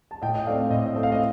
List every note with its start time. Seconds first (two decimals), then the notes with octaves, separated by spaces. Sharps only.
0.11 A5
0.22 A2 D#5 G5
0.35 D#5
0.46 A3 C4 D5 F5
0.70 A2 D#5
0.86 D#5
0.94 A3 C4
1.03 F5
1.12 D#5